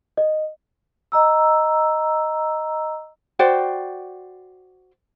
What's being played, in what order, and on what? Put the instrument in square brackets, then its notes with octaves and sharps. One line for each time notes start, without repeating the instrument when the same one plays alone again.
[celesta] D#5
[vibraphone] D#5 A#5 E6
[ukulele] F#4 C5 D5 G5